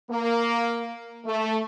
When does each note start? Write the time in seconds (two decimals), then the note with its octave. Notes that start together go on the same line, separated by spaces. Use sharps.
0.10 A#3
1.25 A3